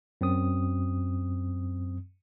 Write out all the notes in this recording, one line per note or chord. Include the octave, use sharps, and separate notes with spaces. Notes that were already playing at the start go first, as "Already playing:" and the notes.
F#2 C4 D#6